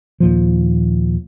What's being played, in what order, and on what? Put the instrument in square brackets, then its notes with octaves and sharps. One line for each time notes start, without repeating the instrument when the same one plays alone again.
[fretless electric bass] D#2 A#2 F3